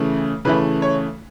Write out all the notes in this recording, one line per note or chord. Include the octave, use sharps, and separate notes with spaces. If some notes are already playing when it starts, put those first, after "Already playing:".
Already playing: C#3 E3 A3
C#3 E3 A3 B4
C#5